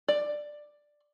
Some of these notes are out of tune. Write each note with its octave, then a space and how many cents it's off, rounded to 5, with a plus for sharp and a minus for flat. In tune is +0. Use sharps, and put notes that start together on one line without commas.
D5 +10